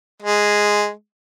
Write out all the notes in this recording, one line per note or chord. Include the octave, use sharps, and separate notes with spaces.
G#3